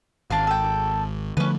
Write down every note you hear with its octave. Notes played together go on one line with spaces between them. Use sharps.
G#1 D4 F5
A4 G5
D3 F3 A3 C#4 B4